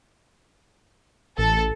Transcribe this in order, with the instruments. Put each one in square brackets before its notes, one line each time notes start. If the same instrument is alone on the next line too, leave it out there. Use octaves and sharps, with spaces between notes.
[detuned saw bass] A1 [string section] A4